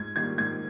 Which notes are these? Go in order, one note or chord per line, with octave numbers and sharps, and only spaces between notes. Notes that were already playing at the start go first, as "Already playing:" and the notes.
Already playing: G#2 G#6
D#3 G3 A#3 G#6
G#2 G#6